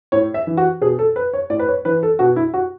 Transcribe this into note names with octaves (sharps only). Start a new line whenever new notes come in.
A2 C#5
E5
E3
F#4
B2 G#4
A4
B4
C#5
A2 D5
B4
C#5
E3 B4
A4
B2 F#4
E4
F#4